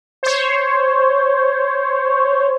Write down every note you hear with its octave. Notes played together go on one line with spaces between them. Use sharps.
C5 C#5